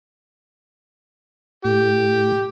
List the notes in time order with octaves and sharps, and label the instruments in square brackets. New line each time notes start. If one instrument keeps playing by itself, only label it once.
[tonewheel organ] A2 [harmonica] G4